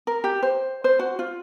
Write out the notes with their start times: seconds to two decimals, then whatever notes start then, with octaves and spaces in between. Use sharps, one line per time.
0.07 A#4
0.24 G4
0.43 C5
0.84 C5
0.99 F#4
1.19 F4